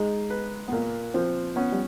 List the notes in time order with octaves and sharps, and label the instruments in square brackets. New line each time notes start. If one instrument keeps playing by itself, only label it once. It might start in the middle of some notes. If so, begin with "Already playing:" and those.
Already playing: [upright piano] G#3 [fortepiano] D#4
[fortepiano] B4
[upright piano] B3
[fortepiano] A#2 [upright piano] A#3
[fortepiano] F3 [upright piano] C4
[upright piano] B3 [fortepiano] C#4
[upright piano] G3